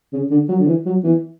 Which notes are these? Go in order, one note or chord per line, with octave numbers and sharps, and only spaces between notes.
C#3
D3
F#3
D3
E3
F#3
E3